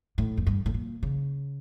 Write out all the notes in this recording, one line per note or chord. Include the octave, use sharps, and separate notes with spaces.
A2
F2
G2
A2
A#2
C#3